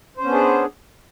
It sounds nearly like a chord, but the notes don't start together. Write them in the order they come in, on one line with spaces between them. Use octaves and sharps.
C5 C#4 B3 D4 G#4